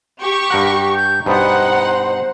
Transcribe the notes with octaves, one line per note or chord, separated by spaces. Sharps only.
G4 C#6
G2 A#4 F#5
G6
G2 B2 B3 D#4 C5 F#5